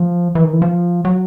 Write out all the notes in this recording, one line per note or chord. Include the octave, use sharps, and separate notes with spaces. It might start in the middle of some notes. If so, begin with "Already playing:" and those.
Already playing: F3
E3
D#3
E3
F3
F#3